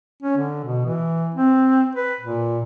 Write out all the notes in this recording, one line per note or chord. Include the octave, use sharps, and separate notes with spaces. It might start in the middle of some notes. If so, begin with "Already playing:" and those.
C#4
D3
B2
E3
C4
B4
A#2